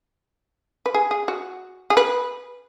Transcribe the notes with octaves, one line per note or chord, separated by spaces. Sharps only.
B4
G#4
G#4
F#4
G#4
B4